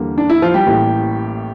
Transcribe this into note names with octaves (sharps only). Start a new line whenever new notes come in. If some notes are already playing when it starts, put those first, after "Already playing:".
Already playing: E2 D3 G3 A#3
D4
E4
F3 F4
G3 G4
A1 A2 G3 A#3